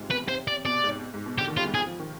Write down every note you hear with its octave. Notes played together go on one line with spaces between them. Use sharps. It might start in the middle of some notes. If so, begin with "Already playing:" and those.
Already playing: G#2 C3 G#3 F4
B2 B4
C3 C5
D5
B2 D5
G#2
G#2
B2
D3 G4
D#3
G3 F4
G#3
F3 G#4
F3
D#3